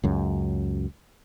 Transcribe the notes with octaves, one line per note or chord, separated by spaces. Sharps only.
C#2 F#2